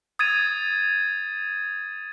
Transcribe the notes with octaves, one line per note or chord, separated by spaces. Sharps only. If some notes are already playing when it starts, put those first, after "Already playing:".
D#6 G#6 A6 D#7